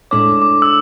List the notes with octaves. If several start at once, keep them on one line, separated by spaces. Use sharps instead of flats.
A2 G#3 D4 A4 C#5 D6
D6
E6